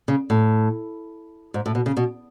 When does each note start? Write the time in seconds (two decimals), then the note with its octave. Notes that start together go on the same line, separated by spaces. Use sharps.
0.08 C#3
0.30 A2
1.54 G#2
1.66 A2
1.75 B2
1.86 C#3
1.97 B2